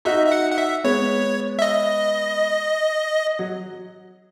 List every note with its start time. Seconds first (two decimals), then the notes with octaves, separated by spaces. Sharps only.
0.05 D#4 F#4 E5
0.26 E5
0.32 F#5
0.52 F#5
0.58 E5
0.84 G#3 B3 C#5
1.59 E5
1.62 D#5
3.39 F#3